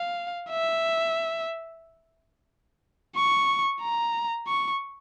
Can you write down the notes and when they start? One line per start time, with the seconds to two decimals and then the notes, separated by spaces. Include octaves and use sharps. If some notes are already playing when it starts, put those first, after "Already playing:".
Already playing: F5
0.50 E5
3.16 C#6
3.81 A#5
4.48 C#6